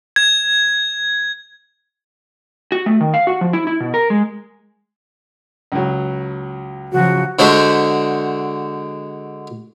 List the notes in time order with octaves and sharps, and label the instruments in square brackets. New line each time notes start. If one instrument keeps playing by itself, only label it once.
[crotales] G#6
[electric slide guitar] F#4
A3
D#3
F5
F#4
F3
E4
E4
B2
A#4
G#3
[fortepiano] C#2 F#3
[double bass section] C#3 F3 F#3 [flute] F#4
[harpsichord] D3 G#3 F#4 C5 E5